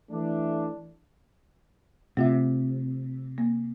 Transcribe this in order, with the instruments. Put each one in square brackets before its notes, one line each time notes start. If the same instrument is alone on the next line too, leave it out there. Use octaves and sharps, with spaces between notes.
[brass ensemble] E3 A3 D4
[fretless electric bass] C3 [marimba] A3 F4 E5
[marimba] A#3